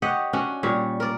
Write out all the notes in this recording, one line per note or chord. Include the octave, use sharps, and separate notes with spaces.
G4 C#5 D#5 F#5
C#4 D4 F#4
A#2 G3 C#5
A#4 D5